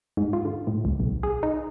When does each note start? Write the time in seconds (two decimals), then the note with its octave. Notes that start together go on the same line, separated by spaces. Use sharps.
0.17 G#2
0.33 F4
0.45 D3
0.67 A2
0.85 C#2
1.00 B1
1.23 G#4
1.43 D#4